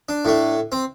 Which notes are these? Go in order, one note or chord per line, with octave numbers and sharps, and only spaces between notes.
D4
A2 A3
C4